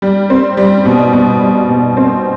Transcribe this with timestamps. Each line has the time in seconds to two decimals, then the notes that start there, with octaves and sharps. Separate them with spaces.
0.02 G3
0.30 C4
0.57 G3
0.85 B2
1.13 B2
1.41 G3
1.69 B2
1.97 C4